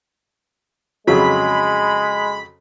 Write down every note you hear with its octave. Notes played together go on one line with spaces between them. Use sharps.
F2 C#3 F#3 G#3 B5